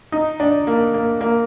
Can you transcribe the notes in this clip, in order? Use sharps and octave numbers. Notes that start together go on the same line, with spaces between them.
D#4
D4
A#3
A#3
A#3